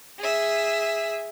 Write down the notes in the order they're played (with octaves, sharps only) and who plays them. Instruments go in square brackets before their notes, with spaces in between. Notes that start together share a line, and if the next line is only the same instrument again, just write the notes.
[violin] G#4 E5